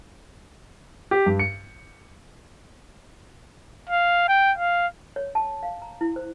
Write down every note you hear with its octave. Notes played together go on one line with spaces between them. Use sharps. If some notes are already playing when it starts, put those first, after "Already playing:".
G4
G2
C#7
F5
G5
F5
C#5
A5
F5
A#5
E4
C5